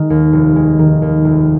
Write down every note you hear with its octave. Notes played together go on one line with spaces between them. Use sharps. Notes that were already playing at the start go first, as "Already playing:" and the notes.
Already playing: D#3 G#3
D#2
F1
G#3
D#3
D#2
F1